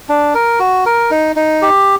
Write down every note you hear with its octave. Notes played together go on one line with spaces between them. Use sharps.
D4
A#4
F#4
A#4
D#4
D#4
G4